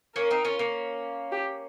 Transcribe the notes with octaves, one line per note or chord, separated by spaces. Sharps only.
A#3 C#4 A#4
C4 D#4
C#4 F4
A#3 C#4
G4